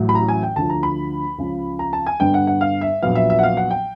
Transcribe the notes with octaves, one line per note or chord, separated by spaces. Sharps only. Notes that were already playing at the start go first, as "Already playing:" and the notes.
Already playing: A1 A2 F#3 A3
B5
A#5
G#5
G5
D2 D3 F3 A5
A#5
B5
C#2 C#3 F3
A#5
A5
G#5
G2 D3 G3 B3 D4 G5
F#5
F#5
F5
E5
A#1 A#2 F#3 B3 F5
E5
E5
F#5
F5
F#5
G5